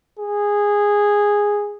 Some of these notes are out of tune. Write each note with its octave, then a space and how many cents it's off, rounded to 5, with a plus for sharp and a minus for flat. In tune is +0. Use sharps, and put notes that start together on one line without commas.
G#4 -10